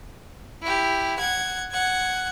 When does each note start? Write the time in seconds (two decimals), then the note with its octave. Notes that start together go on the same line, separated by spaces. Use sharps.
0.63 E4 G4
1.18 F#5 G#6
1.72 F#5 G#6